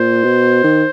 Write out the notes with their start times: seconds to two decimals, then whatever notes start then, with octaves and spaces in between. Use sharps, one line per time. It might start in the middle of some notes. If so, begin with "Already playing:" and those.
Already playing: A#2 C5
0.24 B2
0.64 D#3